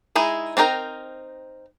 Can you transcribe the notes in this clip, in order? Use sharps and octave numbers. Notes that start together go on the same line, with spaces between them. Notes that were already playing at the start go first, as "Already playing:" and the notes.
G#3 D#4 E4 G#4
C4 D4 D#4 A#4 G5